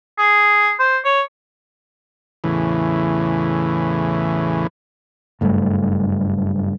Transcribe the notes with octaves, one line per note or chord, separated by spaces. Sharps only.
G#4
C5
C#5
E2 A2 C#3 E3
F#1 G2 A3